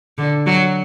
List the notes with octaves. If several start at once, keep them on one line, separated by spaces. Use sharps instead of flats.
D3
F#3